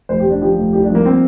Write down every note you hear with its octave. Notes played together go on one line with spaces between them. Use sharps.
F1 C5
G4
F1 D4
F3 G4
F1
C2 G4
D4
F3 A#3
C4